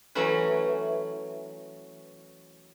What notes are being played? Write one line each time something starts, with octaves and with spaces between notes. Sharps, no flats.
E3 F#3 A3 C#4 B4